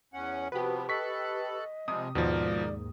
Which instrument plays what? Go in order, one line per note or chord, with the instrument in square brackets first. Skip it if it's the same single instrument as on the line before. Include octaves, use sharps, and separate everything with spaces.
[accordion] E2 C#4 F#5
[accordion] C3 F3 B3 [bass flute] F#4 [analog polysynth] G4 B4
[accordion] A4 F#6 [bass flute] D#5 [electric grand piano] C#6 B6
[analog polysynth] C3 [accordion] F3 G3 G#3 [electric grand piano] D#6
[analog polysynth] D#2 G#2 [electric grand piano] B2 F3 [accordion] A#4 [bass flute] D5